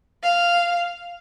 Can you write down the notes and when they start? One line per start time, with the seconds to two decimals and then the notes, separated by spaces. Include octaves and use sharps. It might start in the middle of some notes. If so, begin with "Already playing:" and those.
0.23 F5